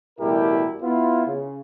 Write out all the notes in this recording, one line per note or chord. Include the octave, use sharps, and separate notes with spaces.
A1 B2 G3 E4 G4 A#4
B3 E4 F4
C#3